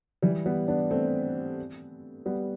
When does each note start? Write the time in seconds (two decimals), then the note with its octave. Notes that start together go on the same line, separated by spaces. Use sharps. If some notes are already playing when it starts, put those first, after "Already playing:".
0.22 E3 G3
0.46 G3 B3
0.68 B3 D4
0.90 A3 C4
2.26 G3 B3